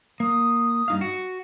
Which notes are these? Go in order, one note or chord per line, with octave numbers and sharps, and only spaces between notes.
A#3 D#6
G2 D#4 F5
F#4